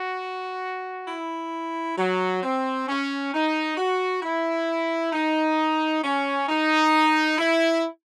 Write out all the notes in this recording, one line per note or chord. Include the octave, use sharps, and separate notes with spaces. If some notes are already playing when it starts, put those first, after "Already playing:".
Already playing: F#4
E4
F#3
C4
C#4
D#4
F#4
E4
D#4
C#4
D#4
E4